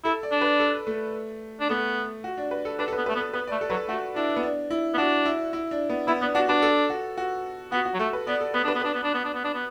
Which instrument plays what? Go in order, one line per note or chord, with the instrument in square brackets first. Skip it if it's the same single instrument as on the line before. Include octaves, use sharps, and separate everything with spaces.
[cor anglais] E4 [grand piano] A4
[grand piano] D5
[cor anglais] D4
[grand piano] B4
A4
A3
[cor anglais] D4
[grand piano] A3 [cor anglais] B3
[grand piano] F#4
D4
B4
A4
[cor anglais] D4 [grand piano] B4
[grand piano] A4
[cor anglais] B3 [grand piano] B4
[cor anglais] A3 [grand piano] B4
[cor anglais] B3
[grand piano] A4
[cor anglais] B3 [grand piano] B4
[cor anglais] A3 [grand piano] D5
[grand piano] A4
[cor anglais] F#3 [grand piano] B4
[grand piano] A4
[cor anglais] A3 [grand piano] F#4
[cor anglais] D4 [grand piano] E4
[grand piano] B3
D4
E4
[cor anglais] B3
[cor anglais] D4 [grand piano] F#4
[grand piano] E4
E4
D4
B3
[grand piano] B3 [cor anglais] E4
[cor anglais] B3 [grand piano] D4
[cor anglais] D4 [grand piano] F#4
[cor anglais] D4 [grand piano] B4
[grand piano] A4
F#4
F#4
[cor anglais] B3 [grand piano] F#4
[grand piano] F#4
[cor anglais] F#3
[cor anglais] A3 [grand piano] A4
[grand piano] B4
[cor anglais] B3 [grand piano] D5
[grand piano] A4
[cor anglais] B3 [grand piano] B4
[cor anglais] D4 [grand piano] B4
[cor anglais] B3
[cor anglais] D4 [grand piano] B4
[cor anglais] B3
D4
B3
D4
B3
D4
B3